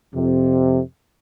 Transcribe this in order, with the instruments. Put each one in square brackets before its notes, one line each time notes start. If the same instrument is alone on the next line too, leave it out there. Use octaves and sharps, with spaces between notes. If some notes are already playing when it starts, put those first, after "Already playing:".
[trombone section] F2 C3